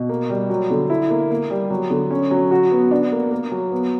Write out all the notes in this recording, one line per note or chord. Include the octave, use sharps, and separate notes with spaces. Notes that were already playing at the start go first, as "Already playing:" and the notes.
Already playing: B2
A#3
G3
F#3
D3
E4
A#3
A#3
G3
F#3
D3
C#4
F#3
F#4
B3
D4
A#3
A#3
F#3
B3